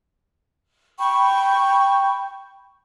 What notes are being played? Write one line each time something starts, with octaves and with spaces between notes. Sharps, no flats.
G5 B5 C#6